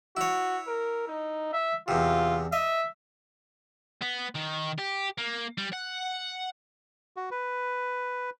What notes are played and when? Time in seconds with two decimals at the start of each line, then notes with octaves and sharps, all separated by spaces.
0.17 E4 F#4 C#5
0.68 A#4
1.08 D#4
1.53 E5
1.88 E2 C3 F4
2.53 D#5 E5
4.02 B3
4.35 D#3
4.78 G4
5.18 A#3
5.58 G3
5.73 F#5
7.16 F#4
7.31 B4